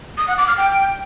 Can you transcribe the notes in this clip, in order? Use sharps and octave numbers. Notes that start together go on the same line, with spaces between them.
D#6
F#5
D6
F6
G5